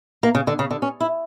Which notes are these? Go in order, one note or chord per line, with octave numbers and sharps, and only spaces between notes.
A#3
C#3
D3
C#3
D3
C#4
E4